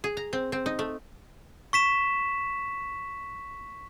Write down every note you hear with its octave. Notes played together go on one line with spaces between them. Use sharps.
G#4
A#5
C4
C4
D#4
A3
C#6 B6 E7